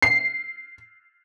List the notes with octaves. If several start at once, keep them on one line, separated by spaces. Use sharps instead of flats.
C7